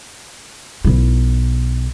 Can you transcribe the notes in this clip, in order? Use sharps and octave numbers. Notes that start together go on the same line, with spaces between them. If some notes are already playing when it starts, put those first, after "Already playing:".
B1 E4